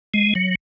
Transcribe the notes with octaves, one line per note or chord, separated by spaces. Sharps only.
G#3
F#3